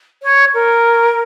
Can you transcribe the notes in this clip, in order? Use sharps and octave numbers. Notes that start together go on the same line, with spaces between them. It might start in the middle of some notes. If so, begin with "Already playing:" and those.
C#5
A#4